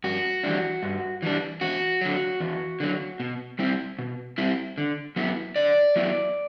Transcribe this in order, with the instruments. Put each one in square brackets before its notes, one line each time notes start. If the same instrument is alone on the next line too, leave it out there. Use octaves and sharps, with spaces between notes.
[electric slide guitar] G2 F#4
E3 G3 D4
G2
E3 G3 D4
E2 F#4
D3 F#3
E2
D3 F#3
B2
G3 C4 E4
B2
G3 C4 E4
D3
F#3 B3 E4
D3 D5
F#3 B3 E4